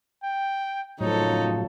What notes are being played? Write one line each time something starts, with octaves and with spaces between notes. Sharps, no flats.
G5
F#1 A2 C#3 F3 F#3 D#4 A4 C#5